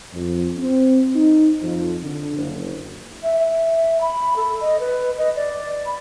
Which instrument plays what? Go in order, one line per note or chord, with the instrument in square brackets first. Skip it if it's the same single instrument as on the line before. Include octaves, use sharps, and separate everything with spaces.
[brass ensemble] F2
C4
D#4
F2
D3
F#1
[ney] E5
E5
B5
A4
D#5
B4
D#5
D5
B5